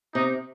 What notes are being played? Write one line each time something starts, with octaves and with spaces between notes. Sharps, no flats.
C3 D#4